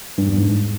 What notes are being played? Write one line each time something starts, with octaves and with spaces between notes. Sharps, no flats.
G2
E2
G#2